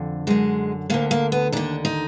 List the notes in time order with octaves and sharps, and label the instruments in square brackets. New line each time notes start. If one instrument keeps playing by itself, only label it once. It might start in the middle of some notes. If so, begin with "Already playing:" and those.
Already playing: [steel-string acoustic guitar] F2 D3
F#2 D3 G#3
D2 D3 A#3
A#3
B3
D#2 D3 D4
D#4